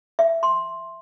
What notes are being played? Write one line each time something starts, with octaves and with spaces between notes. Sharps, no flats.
E5
C6